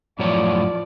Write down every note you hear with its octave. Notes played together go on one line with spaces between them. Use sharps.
F#2 A2 F3 C#5 D5